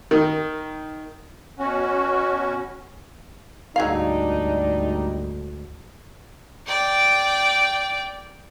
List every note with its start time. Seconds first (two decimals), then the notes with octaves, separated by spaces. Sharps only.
0.11 D#3
1.59 B2 C#4 F#4
3.76 D2 G#2 F#3 G3 D4 D#4 G#4 F5
6.66 D5 G5